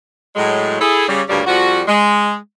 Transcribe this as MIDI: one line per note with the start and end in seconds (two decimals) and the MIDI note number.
0.36 0.78 45
0.36 0.78 54
0.36 0.78 56
0.81 1.08 64
0.81 1.08 68
0.81 1.08 69
1.08 1.21 49
1.08 1.21 55
1.28 1.41 38
1.28 1.41 43
1.28 1.41 49
1.28 1.41 55
1.28 1.41 58
1.28 1.41 74
1.47 1.82 41
1.47 1.82 53
1.47 1.82 55
1.47 1.82 66
1.88 2.36 56